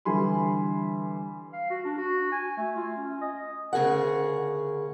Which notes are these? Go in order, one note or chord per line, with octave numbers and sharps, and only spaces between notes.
D3 E3 G3 G#5 B5 C6
F5
F#4
D4
F#4
G#5
A3
F4
C#4
D#5
D2 C#3 G#4 A#4 F#5